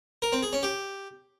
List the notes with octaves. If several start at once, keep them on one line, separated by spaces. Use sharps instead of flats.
A#4
C4
G#4
C#4
G4